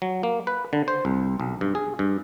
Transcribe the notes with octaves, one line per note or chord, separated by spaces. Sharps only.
F#3
A#3
B4
D3
C5
C2
B1
G2
G#4
G2